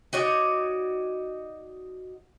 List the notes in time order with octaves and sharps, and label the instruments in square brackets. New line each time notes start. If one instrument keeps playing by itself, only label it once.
[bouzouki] D#4 F#4 C#5 D5